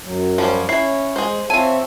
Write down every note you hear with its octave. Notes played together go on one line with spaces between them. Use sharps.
F#2 F#3
F3 G3 C#4
C#4 E4 C#5 C7
G#3 G#4 C5
C4 F4 C#5 E5 G#5 A5 D#7